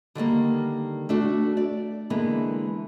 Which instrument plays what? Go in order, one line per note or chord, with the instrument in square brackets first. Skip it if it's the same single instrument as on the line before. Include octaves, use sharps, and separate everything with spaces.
[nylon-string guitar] D3 D#3 G3 A#3
A3 D4 F#4
D5
D3 E3 G#3 A#3 B3